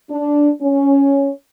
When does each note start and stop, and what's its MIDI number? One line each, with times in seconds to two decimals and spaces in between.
0.11 0.49 62
0.62 1.31 61